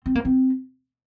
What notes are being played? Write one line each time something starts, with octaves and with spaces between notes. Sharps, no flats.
C4
A#3
C4